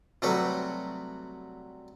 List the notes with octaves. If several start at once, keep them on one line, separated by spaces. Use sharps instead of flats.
C3 F#3 G3 A3 F#4 B4